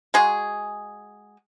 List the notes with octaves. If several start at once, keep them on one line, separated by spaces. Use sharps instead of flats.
G#3 F#4 G#4